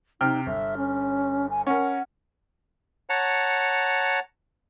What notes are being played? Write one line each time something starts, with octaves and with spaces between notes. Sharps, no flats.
C3 D#4 G5 F6
G1 E5
C#4
G#5
C#4 A#4 F#5
C#5 F#5 A5 A#5